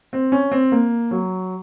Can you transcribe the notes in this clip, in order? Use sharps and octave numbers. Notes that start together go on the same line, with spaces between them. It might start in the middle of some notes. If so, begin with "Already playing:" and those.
C4
C#4
C4
A#3
F#3